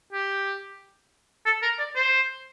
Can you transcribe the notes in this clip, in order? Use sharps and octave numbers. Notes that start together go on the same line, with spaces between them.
G4
A4
A#4
D5
C5